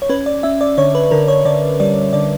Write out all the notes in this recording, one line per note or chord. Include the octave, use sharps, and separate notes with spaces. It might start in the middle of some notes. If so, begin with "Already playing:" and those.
C#5
C#4 B4
D5
C#4 E5
D5
D3 C#5
B4
D3 A#4
C#5
D3 D5
G3 D5
D3 D5